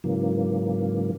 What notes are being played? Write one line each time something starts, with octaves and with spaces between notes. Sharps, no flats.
G#2 C#3 E3 F#3 A#3